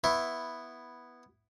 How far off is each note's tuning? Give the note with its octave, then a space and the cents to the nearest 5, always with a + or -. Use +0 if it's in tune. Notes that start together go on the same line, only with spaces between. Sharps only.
B3 +0 E4 +0 C#6 -45